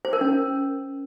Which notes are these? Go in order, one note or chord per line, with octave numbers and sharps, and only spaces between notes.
C5
A#4
C#4